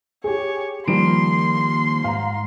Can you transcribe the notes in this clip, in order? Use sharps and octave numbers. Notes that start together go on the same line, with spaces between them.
G4 G#4 C#5
D#3 F3 G3 A#3 C6 D7
G#2 F5 A#5